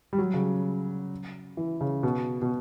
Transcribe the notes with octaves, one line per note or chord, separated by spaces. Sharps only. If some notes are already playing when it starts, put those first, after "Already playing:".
G3
F#3
C#3
E3
C#3
B2
B2